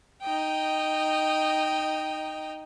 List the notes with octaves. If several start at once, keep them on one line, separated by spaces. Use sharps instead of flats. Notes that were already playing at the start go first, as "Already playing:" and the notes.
D#4 D#5 G5